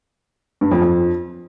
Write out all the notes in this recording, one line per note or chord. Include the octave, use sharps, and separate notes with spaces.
G2
F2
F2